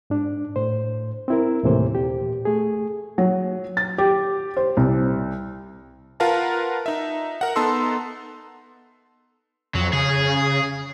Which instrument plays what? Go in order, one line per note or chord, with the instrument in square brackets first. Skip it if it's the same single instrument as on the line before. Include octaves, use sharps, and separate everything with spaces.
[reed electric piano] G#2 D4
A2 C5
C4 E4 A#4
D#2 A2 C3 E3 A#3 C5
A#2 G4
A3 G#4
[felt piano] F#3
A6
G4
C5
C2
[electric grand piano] F4 A#4 B4 F5 F#5 A5
D#4 E5
A#4 F#5
B3 D#4 A4 A5 C6 E6
[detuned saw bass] F2 [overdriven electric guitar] F#3
[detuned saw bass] C#3 [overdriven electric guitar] G#4